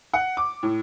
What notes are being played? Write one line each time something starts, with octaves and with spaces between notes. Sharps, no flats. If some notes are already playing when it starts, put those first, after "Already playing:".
F#5
D6
A2